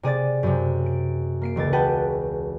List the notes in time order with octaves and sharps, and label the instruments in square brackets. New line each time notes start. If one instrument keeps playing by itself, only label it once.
[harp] C3 G#4 D5 A6
F#2 C3
D7
A#3 C7 D7
E1 C#2 G#6 A6
F#4 G#4 B4 F#5 G5 A5